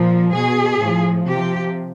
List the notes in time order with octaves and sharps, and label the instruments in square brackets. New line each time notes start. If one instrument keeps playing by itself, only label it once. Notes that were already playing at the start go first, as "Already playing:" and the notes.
Already playing: [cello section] A#2 F3
B2 G#4
A2 F3
C3 F3 G4